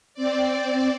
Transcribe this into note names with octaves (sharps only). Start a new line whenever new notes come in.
C4 D5